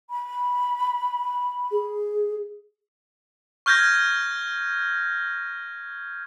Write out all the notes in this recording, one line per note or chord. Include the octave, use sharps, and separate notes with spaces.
B5
G#4
C#6 F6 G6 G#6 A#6